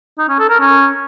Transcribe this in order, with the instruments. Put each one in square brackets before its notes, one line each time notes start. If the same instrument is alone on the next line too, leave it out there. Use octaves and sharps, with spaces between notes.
[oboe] D#4
C#4
A4
A#4
C#4